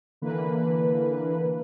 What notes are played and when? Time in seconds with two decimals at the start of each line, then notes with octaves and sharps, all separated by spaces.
0.22 D3 E3 A#3 B4